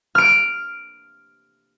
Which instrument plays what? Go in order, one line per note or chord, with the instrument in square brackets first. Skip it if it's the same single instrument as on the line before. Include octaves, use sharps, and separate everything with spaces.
[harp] F6 D7